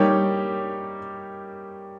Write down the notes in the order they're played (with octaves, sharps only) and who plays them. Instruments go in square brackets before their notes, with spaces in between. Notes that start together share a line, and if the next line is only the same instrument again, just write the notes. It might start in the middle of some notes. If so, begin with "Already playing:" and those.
Already playing: [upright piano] G3 A#3 D#4 G4 C#5